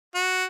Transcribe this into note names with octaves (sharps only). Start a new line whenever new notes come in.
F#4